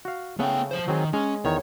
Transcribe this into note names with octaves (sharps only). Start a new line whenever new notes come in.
F#4 F5
C#3 A3 B3 F#5 G5
F3 C5
D#3 F#3 C4 G#4
G#3 C#4
E2 D#3 C#5